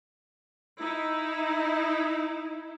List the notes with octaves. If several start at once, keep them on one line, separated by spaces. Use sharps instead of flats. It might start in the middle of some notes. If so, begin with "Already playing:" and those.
D#4 E4